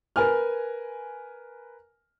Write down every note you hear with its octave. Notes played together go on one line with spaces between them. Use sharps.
A#4 B4 G#5 F6